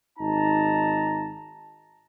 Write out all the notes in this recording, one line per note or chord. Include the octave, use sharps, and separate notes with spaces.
G#1 D#4 A5 A#5